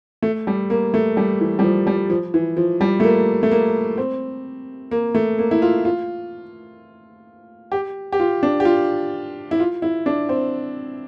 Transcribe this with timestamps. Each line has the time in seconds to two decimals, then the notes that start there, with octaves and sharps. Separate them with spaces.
0.23 A3
0.47 G3
0.70 A#3
0.94 A3
1.17 G3
1.41 E3
1.59 G3
1.63 F3
1.87 G3
2.10 F3
2.34 E3
2.57 F3
2.81 G3
3.00 A3
3.04 A#3
3.43 A3
3.51 A#3
3.98 C4
4.91 A#3
5.15 A3
5.39 A#3
5.51 E4
5.62 F4
5.85 F4
7.72 G4
8.13 G4
8.20 F4
8.43 D4
8.60 G4
8.65 F4
9.51 E4
9.60 F4
9.82 E4
10.06 D4
10.29 C4